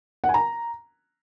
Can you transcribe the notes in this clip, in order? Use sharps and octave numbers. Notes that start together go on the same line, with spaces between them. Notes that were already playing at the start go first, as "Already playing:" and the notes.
F#5
G#5
A#5